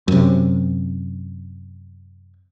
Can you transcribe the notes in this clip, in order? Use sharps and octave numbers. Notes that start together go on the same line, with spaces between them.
F#2 C3